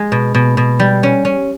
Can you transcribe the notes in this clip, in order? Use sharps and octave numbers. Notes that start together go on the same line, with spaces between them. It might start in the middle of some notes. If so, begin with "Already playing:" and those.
Already playing: G#3
B2
B2
B2
G3
C#4
C#4